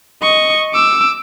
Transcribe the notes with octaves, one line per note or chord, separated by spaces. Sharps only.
D#5 C#6
D6 E6